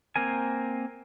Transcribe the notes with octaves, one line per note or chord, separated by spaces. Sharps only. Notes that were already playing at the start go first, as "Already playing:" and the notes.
A#3 C4 A#4 G#5